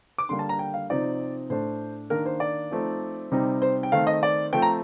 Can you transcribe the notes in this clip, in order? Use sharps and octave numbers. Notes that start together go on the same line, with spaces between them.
D6
D3 G3 A#3 C6
A5
A#5
G5
F5
C3 F3 C4 D#4 D5
A2 A3 D4 C5
D#3 A#3 D4 A#4
C5
D5
F3 A3 C4 D#4
C3 G3 C4 D#4
C5
G5
D#3 A3 C4 F5
D#5
D5
F3 A3 C4 G5
A#5